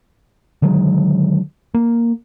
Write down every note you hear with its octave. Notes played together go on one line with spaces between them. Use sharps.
D3 D#3 F#3 G#3
A#3